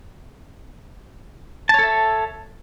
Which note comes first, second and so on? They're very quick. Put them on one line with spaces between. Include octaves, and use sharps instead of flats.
A5 C#5 A4 E5